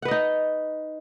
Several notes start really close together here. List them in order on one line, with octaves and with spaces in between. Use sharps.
F#5 B4 D#5 D#4